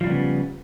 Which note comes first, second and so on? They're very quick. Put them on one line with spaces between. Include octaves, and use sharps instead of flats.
F3 G3 C#3 B3